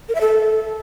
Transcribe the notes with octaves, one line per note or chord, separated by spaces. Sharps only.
A#4
E5
A4